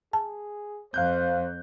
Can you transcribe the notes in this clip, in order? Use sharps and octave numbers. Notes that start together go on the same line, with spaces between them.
G#4 A5
F2 C5 F5 F#6 G6